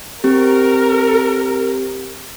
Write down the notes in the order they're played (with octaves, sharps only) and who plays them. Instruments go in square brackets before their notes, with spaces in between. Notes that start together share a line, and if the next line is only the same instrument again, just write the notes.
[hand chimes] C4 G4 [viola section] A#4